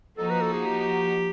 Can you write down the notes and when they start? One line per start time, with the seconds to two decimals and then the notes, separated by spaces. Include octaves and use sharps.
0.18 F3 A#3 D#4 F#4 A4
0.30 B4
0.41 A4
0.53 G#4
0.65 G4